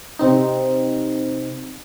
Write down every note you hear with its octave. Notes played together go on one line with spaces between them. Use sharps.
C3 C4 D#4